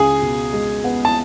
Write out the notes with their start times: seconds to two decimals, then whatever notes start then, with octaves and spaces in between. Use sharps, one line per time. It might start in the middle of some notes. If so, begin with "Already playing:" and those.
Already playing: C#2 G#4 G#5
0.21 B2
0.53 G#3
0.84 B3
1.05 A5